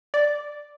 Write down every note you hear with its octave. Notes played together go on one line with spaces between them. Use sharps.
D5